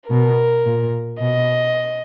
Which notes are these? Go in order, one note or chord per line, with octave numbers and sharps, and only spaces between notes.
B2 A#4
A#2
B2 D#5